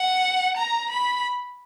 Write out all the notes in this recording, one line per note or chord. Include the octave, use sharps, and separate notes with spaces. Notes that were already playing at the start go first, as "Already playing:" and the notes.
Already playing: F#5
A#5
B5